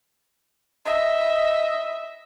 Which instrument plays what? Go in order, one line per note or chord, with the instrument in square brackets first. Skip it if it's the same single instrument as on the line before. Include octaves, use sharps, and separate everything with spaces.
[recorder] D#5 [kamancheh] E5